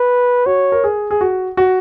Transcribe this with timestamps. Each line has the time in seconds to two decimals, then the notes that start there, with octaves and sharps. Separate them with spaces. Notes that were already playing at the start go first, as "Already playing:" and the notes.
Already playing: B4
0.46 F#4 C#5
0.72 A#4
0.84 G#4
1.11 G#4
1.21 F#4
1.57 F#4